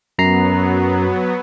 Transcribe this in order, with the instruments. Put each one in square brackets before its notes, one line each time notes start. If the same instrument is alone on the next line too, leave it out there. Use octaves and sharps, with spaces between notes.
[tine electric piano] F#2 A#5 C7 [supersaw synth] F#3 B3